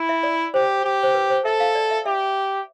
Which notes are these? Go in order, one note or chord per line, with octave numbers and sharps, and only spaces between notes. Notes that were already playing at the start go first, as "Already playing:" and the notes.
Already playing: E4
E5
D5
G4 C5
G4
C5
B4
C5
A4 E5
F5
D5
E5
G4 E5